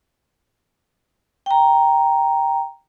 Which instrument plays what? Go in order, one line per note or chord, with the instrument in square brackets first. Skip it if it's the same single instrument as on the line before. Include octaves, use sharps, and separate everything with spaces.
[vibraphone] G5 A#5